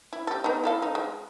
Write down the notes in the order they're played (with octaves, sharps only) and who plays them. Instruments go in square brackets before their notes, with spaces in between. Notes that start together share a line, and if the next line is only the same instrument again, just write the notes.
[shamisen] E4
G4 A4
B3 D#4
E4 A4 F5
D#4
G#3